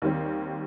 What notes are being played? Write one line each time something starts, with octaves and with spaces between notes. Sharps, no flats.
D#2 D#3 G3 C4